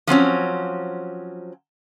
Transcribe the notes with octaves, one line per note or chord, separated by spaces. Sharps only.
F3 F#3 C4 C#4